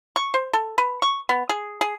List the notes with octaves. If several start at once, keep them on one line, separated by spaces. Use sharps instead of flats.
C#6
C5
A4
B4
C#6
B3
G#4
G#4